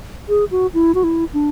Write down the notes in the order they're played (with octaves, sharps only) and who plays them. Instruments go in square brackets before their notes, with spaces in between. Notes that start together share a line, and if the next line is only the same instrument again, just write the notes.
[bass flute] G#4
F#4
E4
F#4
E4
D4